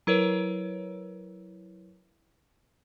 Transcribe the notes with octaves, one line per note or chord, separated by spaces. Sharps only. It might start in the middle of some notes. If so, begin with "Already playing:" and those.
F#3 E4 A#4 B4 C#5